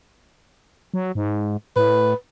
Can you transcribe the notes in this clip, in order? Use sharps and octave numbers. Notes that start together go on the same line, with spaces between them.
F#3
G#2
A2 B4